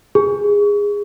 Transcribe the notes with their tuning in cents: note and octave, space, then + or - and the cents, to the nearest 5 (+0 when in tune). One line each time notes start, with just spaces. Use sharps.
G#4 -20